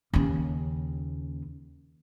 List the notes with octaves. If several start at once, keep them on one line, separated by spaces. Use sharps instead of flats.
D#2 C#3